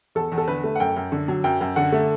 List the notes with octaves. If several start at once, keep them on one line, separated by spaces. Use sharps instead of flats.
E2 A4
E2
A4
D3 B4
A3
F#5
F#2 G5
F#2
D3
F#3
F#2 G5
F#2
D3 F#5
A3